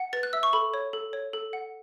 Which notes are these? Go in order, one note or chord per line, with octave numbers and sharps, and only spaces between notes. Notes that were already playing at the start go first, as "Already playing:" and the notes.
Already playing: F#5
B4 A6
F#6
E5 E6
C#6
A4 B5
C#5
A4
C#5
A4
F#5